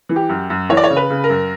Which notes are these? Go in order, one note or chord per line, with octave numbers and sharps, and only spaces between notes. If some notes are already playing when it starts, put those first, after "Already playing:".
E3
G4
F#2
F#2
E3 C#5
D5
C#5
C#3
B4
C#3
A#4
F#2